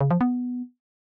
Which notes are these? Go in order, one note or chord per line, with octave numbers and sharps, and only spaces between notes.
C#3
F3
B3